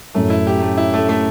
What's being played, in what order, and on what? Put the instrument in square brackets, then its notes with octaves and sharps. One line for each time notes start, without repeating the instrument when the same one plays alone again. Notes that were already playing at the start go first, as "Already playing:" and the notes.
[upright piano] F#2 A2 [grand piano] A3
[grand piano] E4
G4
A3
E4
A3
A3